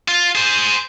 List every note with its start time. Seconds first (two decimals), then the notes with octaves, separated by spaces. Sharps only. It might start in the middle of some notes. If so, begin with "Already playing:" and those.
0.08 F4
0.35 G#4 C5